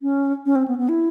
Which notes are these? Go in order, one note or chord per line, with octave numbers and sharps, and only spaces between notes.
C#4
C#4
C4
B3
B3
E4